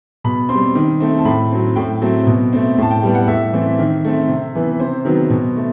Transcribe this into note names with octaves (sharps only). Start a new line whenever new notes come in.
B2 B5
C4 C6
G3
D#3
A3 C4
A5
A2 B5
F#3 C4
A2 G5
F#3 A3 C4
B2
A3 C4
A2 A5
G5
G3 B3
F#5
A2 E5
E3 A3 C4
D#3
A3 C4
C3
E3 B3
C3 C5
D#3 F#3 B3
B2
A3